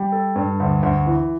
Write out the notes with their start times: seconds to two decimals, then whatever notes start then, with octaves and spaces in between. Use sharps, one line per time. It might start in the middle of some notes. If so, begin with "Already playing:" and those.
Already playing: G3
0.12 A4
0.36 G2
0.60 D2
0.83 D2
1.06 E3